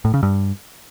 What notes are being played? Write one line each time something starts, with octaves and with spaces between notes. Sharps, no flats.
A2
C#3
G2